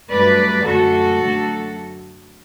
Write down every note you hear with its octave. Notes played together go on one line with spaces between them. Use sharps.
G2 F#3 A3 B4 D5
F#2 D3 A3 F#4 A4
F#2 D3 F#3 A3